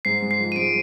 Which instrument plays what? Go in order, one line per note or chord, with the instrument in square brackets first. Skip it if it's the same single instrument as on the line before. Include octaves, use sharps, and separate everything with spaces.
[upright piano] G#2 [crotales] C7
[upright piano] G#3
[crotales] C7
[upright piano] F3
[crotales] D#7
[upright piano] G#3 [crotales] D7